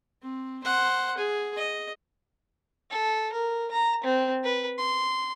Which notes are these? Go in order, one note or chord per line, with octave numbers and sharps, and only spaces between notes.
C4
C5 F#5
G#4
D#5
A4
A#4
A#5
C4
B4
C6